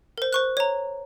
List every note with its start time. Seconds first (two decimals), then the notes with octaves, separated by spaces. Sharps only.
0.18 A#4 C5
0.33 C5 C#6 F#6
0.57 C#5 A#5